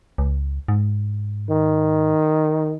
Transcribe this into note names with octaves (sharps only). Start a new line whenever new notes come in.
C#2
G#2
D#3